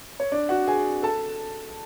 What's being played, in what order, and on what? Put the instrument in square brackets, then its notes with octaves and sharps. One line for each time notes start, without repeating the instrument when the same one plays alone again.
[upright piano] C#5
D4 D5
F#4 F#5
G#4 G#5
A4 A5